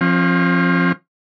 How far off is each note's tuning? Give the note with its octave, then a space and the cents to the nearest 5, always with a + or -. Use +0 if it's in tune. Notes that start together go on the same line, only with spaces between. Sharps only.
F3 +0 C4 +45